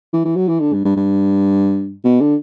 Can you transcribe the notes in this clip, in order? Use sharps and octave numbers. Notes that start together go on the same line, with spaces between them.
E3
E3
F#3
E3
D3
G2
G2
G2
B2
D3